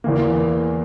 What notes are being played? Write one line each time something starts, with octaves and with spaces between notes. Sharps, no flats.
E2 E3 A#3